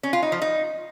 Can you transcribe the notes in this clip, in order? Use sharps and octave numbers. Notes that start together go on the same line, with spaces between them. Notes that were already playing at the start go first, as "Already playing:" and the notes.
C#4
F4
D#4
F3
D#4